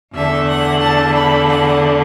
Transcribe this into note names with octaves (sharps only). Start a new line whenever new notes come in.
E2 D3 A3 E5
F#5
A5
B5
F#5